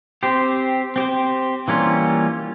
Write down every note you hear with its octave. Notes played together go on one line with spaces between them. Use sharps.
C4 G4 C5
C4 G4 C5
E3 G3 A#3 C#4 F4